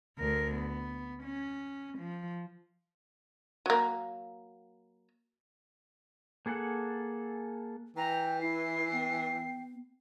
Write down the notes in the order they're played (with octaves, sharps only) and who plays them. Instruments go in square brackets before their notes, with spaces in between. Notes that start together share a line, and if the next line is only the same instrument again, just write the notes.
[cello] D2 A#4
B3
C#4
F3
[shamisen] F#3 A#3
[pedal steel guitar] A#3 G#4 A4 F#5
[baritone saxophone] E3 [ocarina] B4 [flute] G5 [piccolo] A#5
[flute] E4 [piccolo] C7
[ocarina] B3 [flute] G5